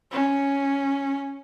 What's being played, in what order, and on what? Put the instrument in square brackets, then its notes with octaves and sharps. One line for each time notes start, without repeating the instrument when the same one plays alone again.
[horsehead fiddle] C#4